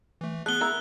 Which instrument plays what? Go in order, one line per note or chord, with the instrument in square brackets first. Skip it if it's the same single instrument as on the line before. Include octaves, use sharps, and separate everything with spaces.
[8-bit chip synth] E3 A3
[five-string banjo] A3 [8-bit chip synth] B3 G#4 [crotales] F#6 G7
[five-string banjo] E4 A#4 E5